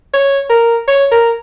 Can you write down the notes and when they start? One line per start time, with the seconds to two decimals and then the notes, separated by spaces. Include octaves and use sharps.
0.14 C#5
0.50 A#4
0.88 C#5
1.12 A#4